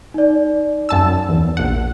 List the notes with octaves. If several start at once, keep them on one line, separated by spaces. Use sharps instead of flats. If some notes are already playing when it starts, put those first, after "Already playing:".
D#4 D5
F#2 A5 E6
E2
A#1 F#5